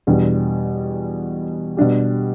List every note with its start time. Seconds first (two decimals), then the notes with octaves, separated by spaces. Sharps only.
0.07 E2 B2 G3 D4
1.77 B2 G3 D4 G4